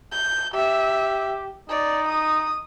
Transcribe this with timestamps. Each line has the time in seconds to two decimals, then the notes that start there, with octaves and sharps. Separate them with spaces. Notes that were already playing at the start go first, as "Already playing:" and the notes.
0.12 G6
0.54 G4 E5
1.69 D#4 D5
2.08 D#6